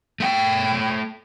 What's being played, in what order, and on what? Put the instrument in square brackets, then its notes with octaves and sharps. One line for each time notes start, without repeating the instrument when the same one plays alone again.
[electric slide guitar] A3 F#5 G5